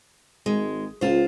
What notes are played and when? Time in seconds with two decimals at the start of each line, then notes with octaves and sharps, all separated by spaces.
0.46 G#1 G#3
1.01 C#2 F4 C5